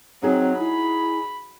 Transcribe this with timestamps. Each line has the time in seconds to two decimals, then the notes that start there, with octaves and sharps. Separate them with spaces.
0.23 F#3 C4 D#4 G#4
0.59 E4 B5